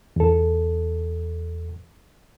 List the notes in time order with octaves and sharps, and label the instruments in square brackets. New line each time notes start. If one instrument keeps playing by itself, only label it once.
[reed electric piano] E2 A4